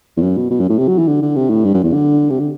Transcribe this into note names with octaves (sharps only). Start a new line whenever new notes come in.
E2
F#2
B2
B2
F#2
A2
C3
F#3
E3
D3
D3
C3
A2
G2
F#2
E2
D3
C3
D3